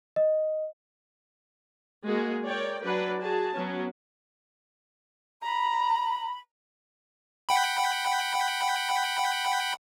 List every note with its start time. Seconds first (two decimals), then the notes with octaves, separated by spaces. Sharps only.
0.16 D#5
2.05 G#3 A#3 F#4 G#4
2.46 A#4 C#5 D5 G5
2.82 F#3 D4 B4 D5 F#5
3.19 F#4 G#4 A5
3.56 F#3 B3 C#4
5.43 A#5 B5
7.49 F#5 G5 B5